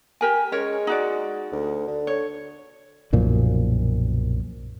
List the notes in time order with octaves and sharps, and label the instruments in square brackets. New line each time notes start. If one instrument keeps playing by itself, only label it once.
[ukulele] G4 A#4 G#5
[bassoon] G#3 [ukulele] C#4 A#4 C#5
[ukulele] D#4 F#4 D5
[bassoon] D2
D3
[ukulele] C#5
[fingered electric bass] B1 F#2 A#2 F3